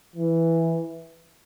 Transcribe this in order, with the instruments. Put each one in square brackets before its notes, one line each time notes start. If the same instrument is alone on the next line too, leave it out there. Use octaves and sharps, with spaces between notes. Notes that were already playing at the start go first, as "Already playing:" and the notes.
[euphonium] E3